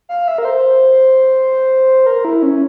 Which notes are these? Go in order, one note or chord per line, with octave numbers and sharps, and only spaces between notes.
F5
E5
A#4
C5
A#4
E4
C#4